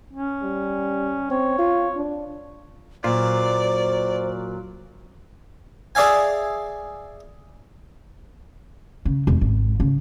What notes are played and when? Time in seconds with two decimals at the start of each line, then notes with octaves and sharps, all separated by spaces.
0.13 C#4
0.43 G3
1.30 C4 C#5
1.59 F4
1.96 D4
3.04 A#2 F#3 F4 C5 D5
5.95 G#4 D5 E5 F5 G#5
9.05 C#3
9.27 E1
9.41 G#1
9.80 C#3